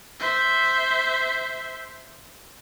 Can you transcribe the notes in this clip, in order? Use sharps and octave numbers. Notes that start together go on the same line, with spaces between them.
C5 E5